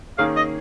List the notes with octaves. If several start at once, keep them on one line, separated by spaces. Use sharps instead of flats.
D#3 A#3 C#4 G#4 F5
D#5